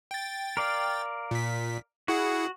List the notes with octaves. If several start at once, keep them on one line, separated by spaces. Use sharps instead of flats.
G5 A6
A#4 D5 F5
A#2 B6
E4 F#4 G#4 F#5